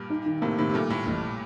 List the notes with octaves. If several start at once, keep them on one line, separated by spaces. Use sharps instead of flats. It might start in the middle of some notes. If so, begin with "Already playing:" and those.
Already playing: G2 A#2
D#4
D#3
A2 C3 A#3
A2 C3 D#3
C3
G2 A#2 A3
A2 A3
A1 A2